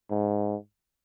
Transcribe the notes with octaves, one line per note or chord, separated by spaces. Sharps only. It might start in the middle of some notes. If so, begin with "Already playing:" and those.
G#2